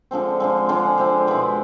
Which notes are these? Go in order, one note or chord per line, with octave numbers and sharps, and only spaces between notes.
D3 F3 G#3 C4
D3 F3 G#3 C4
D3 F3 G#3 C4
D3 F3 G#3 C4
B2 G#3 B3 E4